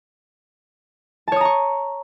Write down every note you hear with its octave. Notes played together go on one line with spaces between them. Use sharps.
C#5 A5 A#5 C#6 D#6